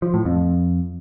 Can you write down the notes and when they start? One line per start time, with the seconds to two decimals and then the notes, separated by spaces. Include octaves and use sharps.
0.02 F3
0.14 A2
0.25 F2